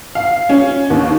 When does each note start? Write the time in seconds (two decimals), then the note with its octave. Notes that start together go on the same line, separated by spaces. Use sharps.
0.15 F5
0.49 C#4
0.90 D#2